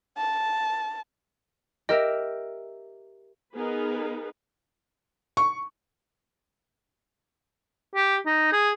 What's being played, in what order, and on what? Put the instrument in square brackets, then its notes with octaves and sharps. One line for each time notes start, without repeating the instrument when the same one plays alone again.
[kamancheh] A5
[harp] G4 A#4 E5 [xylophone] D#5
[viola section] B3 D#4 G#4 A#4 B4
[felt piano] C#6
[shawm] G4
D#4
G#4